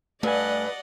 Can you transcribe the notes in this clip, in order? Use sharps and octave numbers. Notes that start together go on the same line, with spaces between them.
G2 A3 B4 D5 D#5 F#5 G#5